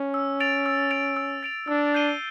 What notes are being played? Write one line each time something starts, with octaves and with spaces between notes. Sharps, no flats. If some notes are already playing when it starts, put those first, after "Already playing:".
Already playing: C#4
E6
A6 D7 F7
E6
A6 D7 F7
E6
A6 D7 F7
D4 E6
G6 C7 D#7 G7